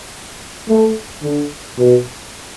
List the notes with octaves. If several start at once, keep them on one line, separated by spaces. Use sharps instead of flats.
A3
D3
B2